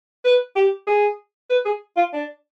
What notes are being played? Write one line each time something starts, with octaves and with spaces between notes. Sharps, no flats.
B4
G4
G#4
B4
G#4
F4
D4